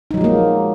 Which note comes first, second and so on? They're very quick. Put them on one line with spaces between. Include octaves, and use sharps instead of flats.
D#4 F#3 F3 G#3 A#3